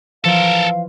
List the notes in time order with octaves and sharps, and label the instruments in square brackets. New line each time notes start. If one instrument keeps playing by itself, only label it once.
[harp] E3 F3 F4 [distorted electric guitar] A4 A#4 [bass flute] F5